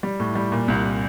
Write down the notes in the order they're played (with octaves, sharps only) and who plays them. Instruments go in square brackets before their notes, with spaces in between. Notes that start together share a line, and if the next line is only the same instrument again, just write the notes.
[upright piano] G3
A2
G3
A#2
C2